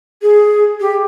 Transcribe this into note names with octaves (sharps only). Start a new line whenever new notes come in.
G#4
G4